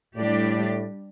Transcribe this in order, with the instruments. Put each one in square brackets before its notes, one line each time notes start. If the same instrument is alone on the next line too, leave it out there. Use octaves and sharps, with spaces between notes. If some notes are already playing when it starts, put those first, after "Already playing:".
[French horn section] A2 [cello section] G3 D4 G4 D5